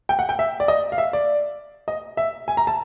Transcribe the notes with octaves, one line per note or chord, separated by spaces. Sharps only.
G5
F#5
G5
E5
D5
D#5
F5
E5
D5
D#5
E5
G#5
A#5
A5